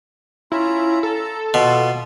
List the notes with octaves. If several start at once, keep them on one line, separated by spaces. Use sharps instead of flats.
C#4 E4 F4 A#5
A4 A#5
B2 F4 C6